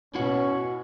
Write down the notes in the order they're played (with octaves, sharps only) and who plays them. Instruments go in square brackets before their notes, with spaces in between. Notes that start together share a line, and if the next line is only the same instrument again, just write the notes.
[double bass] B2 [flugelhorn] C#4 [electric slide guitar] E4 F#4 F#5